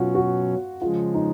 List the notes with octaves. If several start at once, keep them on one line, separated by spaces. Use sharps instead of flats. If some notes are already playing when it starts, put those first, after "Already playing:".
Already playing: B2 F#3 C#4 F4 F#4
F#4
C#3 F3 G#3 F4
D#4